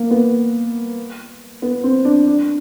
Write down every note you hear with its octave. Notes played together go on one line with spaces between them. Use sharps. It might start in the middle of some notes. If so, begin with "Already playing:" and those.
Already playing: A#3
B3
B3
C4
D4
D4